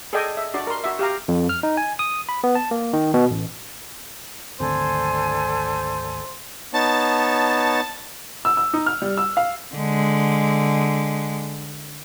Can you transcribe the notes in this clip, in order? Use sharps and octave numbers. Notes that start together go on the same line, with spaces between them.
G#4 A4 D5 D#5 G5 G#5
E5
D4 F#4 D5
A#4 C6
F#4 E5
G4 F5 A#5
F2
F6
D#4
G#5
D#6
B5
B3
A5
A#3
D#3
B2
A1
G#1 D2 C4 D4 A4 C5 G#5
B3 D#4 C#5 A5 A6
E6
E6
D#4
F6
G3
E6
F5
D3 G#3